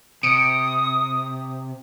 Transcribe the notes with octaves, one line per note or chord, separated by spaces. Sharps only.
C3 D#6 C#7 D7